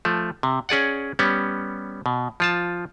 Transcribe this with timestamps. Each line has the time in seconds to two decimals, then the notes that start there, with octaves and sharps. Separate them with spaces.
0.05 F3 A3
0.43 C3
0.69 C#4 G#4 D5 F#5
1.19 G3 B3 C#4
2.06 B2
2.40 F3 F4 A5